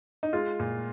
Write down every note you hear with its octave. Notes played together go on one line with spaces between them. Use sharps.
D#4
G#3 F4
A#2